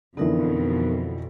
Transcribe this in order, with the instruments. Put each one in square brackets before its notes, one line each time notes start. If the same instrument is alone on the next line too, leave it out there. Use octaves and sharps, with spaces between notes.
[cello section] F2 B2 [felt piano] D3 E3 [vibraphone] B3 D#4 A#4